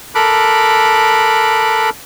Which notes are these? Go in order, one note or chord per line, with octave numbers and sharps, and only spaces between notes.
A4 A#4 B5 D6 F#6